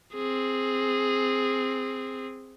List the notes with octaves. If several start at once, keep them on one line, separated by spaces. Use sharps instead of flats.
C4 G#4